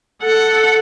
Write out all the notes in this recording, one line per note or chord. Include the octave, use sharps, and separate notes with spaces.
A4 F#5